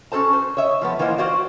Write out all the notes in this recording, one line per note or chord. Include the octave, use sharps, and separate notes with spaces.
C#4 F#4 A4 C5 A5
C5
C#5 D#5 E5
F3 A3 B3
E3 A#3 F4 C5 D#5
F#4 C5 D5 F5